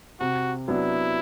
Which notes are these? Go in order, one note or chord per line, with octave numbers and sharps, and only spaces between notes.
C3 F#4
F#3 B3 D4 E4